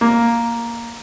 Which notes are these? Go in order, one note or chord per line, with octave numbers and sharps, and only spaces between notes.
A#3